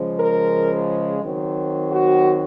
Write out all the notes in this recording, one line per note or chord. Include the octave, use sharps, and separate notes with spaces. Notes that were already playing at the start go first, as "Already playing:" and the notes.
Already playing: C#3 F3 G#3
A#4
D#3 F#3 C4
F#4